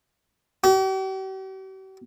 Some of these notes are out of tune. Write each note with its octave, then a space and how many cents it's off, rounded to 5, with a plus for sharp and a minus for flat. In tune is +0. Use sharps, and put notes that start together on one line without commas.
G4 -45